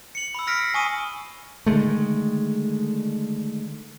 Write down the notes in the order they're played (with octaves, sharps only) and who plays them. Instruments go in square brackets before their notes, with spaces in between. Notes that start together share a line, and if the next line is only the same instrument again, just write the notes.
[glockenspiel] C#7 F#7
B5 E6
E6 F6 A#6 B6 C#7 D7
C7
G#5 C#6 D#6 D#7
[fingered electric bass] D3 D#3 G#3 A3